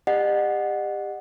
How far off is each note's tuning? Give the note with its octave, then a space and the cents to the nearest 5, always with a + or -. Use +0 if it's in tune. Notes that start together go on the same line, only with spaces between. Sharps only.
G4 +30 D#5 -45 F#5 -10